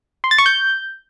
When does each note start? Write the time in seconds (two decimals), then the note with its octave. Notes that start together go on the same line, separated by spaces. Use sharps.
0.24 C6
0.31 A6
0.38 C#6
0.46 G6